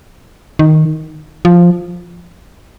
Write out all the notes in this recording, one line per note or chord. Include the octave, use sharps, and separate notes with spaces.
D#3
F3